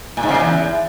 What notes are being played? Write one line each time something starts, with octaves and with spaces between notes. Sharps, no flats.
A#2
G#2
C#3
A#2
E2